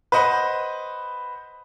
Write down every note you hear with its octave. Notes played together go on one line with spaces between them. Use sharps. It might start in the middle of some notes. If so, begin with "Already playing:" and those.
B4 C5 D#5 F#5